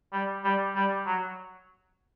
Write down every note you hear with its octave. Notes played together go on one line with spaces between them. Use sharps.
G3
G3
G3
F#3